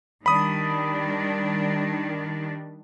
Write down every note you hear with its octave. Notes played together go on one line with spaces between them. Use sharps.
D#3 G3 D4 B5 D#6